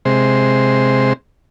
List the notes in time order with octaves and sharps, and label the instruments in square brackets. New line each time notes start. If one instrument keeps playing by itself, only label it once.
[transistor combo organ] C3 G#3 C5